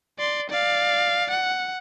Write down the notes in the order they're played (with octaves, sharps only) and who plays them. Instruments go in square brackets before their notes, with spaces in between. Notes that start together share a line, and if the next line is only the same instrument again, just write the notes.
[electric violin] D5 C6
D5 F5
F#5